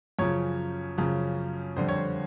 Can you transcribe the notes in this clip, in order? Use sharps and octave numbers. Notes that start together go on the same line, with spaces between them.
F#2 C#3 F3 C#5
F#2 C#3 F3
F2 D3 G3 C5
C#5
C5